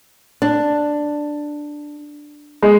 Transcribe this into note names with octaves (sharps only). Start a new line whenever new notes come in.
D4
G#3